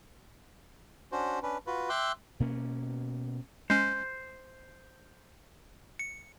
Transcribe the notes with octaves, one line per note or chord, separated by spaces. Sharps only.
C#4 D4 F#4 C5
C#4 D4 B4
F4 F#4 B4
E5 G5 C6 D6 E6 F#6
B2 A#3 C#4
G#3 C#4 C5
C#7